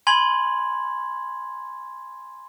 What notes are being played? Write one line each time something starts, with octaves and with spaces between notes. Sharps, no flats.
G#5 B5 C6 G#6 F#7